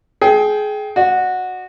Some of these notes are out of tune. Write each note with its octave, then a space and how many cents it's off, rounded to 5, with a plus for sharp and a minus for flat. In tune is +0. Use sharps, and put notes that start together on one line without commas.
G#4 +25 G5 +0
F#4 -10 D5 +30